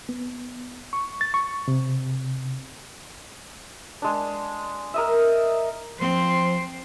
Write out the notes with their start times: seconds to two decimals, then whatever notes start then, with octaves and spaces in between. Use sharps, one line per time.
0.09 B3
0.93 C#6
1.21 A6
1.34 C#6
1.68 C3
4.02 G#3 D4
4.94 A#4 D#5 E5
5.99 F3 C4 C5